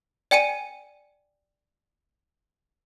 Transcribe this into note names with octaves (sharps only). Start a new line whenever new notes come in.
D5 G5 G#5 C#7 D#7